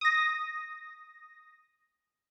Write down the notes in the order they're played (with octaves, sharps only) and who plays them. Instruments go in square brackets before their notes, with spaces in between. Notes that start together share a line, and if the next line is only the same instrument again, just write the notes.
[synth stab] D#6 A#6